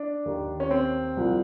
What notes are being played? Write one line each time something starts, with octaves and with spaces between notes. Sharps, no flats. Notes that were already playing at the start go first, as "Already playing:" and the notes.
Already playing: D4
D#2 D#3
C#4
C4
C2 C3 F3